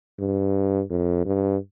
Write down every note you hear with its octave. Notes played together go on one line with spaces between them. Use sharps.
G2
F2
G2